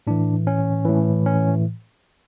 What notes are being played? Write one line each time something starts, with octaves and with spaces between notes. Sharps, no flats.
A2 E3 D4
C#4
A2 E3
C#4